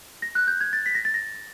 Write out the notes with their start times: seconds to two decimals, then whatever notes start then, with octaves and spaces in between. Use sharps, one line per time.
0.22 A#6
0.35 F#6
0.47 G6
0.61 G#6
0.73 A6
0.86 B6
0.95 A#6
1.05 A6
1.14 A#6